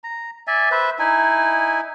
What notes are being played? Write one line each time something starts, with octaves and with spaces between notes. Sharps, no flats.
A#5
D5 E5 G#5
B4 C5 E5
D#4 E4 G#5